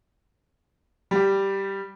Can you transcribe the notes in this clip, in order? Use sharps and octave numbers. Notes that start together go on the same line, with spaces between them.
G3 G4